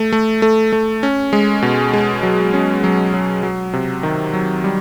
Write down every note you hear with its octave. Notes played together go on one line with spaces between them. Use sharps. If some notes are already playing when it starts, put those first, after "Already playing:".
Already playing: A3
A3
A3
A3
C#4
G#3
B2
G#3
F#3
C#4
F#3
F#3
F#3
C3
D#3
F#3
G3